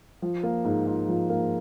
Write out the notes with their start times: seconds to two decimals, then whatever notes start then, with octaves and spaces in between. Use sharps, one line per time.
0.22 F3
0.43 A#3
0.65 G#2
0.87 F4
1.08 F3
1.30 A#3